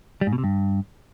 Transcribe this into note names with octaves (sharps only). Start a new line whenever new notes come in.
G3
G#2
B2
C3
G2